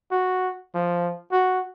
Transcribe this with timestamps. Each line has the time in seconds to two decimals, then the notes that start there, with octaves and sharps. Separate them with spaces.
0.11 F#4
0.75 F3
1.32 F#4